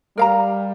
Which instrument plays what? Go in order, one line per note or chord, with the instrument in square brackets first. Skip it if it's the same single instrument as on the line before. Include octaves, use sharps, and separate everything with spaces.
[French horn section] G3 [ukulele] A#4 F5 A#5